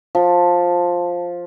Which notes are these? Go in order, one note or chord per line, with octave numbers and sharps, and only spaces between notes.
F3